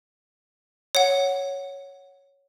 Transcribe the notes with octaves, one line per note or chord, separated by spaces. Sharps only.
C#5 F#5